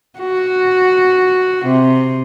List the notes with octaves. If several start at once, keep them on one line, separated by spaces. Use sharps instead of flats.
F#4
C3